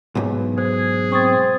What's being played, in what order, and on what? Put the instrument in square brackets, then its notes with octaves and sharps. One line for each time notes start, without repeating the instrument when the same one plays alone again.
[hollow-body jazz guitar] B1 G#2
[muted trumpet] G#4 [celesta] C5
[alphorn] C4 [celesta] C#6 D#6 A6